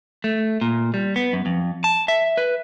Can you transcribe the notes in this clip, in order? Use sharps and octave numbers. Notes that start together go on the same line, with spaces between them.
A3
A#2
G3
B3
F#2
F2
A5
E5
B4